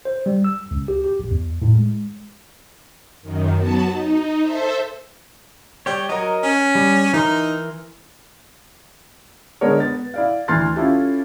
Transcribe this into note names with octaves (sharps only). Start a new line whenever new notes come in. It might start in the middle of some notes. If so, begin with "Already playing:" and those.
C5
G3
E6
C#2
G4
G4
A#1
E2
A2
G#3
F#2 D#3
F#3 B3 F#4 A5
D#4
A4 C5 E5
G3 C#5 G5
F#3 A#4 D#5
C#4
G3
E3 D#4 A#4 C6
D3 G#3 B3 A#4 C#5
B3 A6
E4 D5 F5
D2 E3 C6 F6 A6
C#4 E4 F4 G4 A4